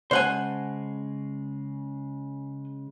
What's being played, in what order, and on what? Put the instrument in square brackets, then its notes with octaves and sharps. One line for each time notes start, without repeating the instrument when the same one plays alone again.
[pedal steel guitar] C#3 G#3 A5 [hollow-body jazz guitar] C5 F#5 G#5